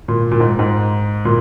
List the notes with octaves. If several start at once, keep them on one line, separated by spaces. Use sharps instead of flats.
A#2
A#2
G#2
G#2
A#2